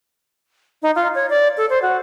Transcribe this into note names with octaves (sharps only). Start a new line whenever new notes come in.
D#4
F4
C#5
D5
A4
C5
F#4